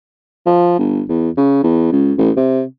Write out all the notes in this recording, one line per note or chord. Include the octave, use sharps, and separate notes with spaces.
F3
G1
E2
C#3
E2
C#2
A1
C3